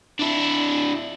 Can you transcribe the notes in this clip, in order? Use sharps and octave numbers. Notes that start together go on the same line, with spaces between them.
D4 E4